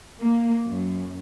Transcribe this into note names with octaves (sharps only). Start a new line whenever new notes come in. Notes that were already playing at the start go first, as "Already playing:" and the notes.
A#3
F#2